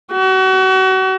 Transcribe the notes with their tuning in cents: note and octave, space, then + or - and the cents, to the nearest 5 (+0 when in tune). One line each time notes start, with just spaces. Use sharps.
F#4 +35